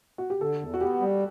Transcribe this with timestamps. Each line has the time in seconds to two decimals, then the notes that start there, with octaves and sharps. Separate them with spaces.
0.18 F#4
0.30 G4
0.40 D3 A4
0.61 E2
0.74 F#4
0.81 B3 G4
1.01 G3